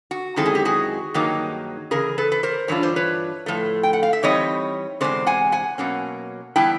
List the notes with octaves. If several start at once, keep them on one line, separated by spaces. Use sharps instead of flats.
F#4
F#2 D#3 G#3 C4 E4 A4
G#4
G4
F#4 G#4
G2 D#3 F#3 A#3 D#4
C#3 E3 G#4 A#4
A4 B4
B4
A#4 C5
G2 E3 D4 F4 C#5
C5
B4 C#5
A2 F3 A3
G5
F#5
F5
E5
E3 G3 C4 D#4 C#5 D#5
E2 C3 E3 G#3 C4 C5 D5
F#5 G#5
F#5 G#5
B2 F#3 A#3 C#4
E3 G3 B3 E4 G5 A5